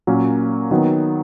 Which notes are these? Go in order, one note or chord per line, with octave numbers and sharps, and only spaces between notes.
A#2 F#3 A#3 C#4
D#3 F#3 B3